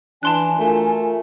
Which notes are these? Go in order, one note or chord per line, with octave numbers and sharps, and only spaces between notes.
E3 D4 G#5 A5 C6 F#6
A3 F4 F#4 A#4